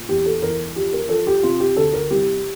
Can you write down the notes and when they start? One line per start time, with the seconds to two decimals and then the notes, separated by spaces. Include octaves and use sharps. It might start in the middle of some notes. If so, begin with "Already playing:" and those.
Already playing: A#2
0.09 E2 G4
0.26 A4
0.42 E2 A#4
0.76 F3 G4
0.93 A#4
1.09 F3 A4
1.27 G4
1.43 C3 F4
1.60 G4
1.76 D2 A4
1.94 A#4
2.10 C2 G4